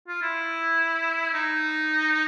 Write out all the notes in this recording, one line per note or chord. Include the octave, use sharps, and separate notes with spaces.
F4
E4
D#4